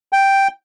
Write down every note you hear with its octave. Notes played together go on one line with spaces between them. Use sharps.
G5